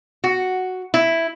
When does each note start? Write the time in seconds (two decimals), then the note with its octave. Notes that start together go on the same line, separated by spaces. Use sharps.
0.24 F#4
0.94 E4